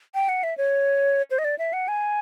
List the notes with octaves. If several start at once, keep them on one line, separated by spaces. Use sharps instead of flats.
G5
F#5
E5
C#5
C5
D#5
D5
E5
F#5
G#5